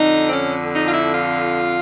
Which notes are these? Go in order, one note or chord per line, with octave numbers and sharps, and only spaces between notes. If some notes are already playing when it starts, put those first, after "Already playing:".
Already playing: F2 D3 D#4
C4
C#4
D#4
F4
E4
F4